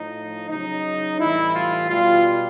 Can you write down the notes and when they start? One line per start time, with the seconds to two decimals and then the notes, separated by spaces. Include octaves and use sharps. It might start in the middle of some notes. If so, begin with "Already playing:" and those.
Already playing: A2 F3 D#4
0.49 C#3 F#3 D#4
1.20 A2 E3 G3 E4
1.55 F4
1.90 B2 G3 F4